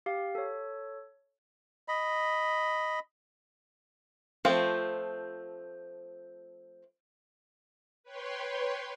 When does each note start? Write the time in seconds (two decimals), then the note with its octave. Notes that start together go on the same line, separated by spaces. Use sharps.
0.06 G4 F5
0.35 A4 C#5
1.88 D#5 B5
4.45 F3 A3 C4 F4
8.03 B4 C#5 G5 C6